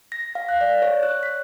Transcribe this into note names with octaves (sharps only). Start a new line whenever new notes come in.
A#6
F5
F#6
D5
C#5
F#6
B6